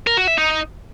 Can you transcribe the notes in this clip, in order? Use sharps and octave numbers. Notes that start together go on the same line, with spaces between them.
A#4
F#4
E5
D#4